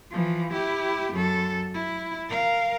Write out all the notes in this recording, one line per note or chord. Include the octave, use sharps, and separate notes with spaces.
E3 F3
E4 G4
F#2 A4
E4
A#4 F5